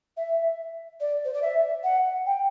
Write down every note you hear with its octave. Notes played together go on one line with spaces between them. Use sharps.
E5
D5
C5
D5
E5
F#5
G5